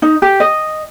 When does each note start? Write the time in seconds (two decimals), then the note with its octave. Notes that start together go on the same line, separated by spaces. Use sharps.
0.02 D#4
0.22 G4
0.40 D#5